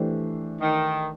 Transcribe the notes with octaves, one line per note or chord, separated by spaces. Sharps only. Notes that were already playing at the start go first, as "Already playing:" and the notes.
Already playing: E3 A3 D4 G4 C5
D#3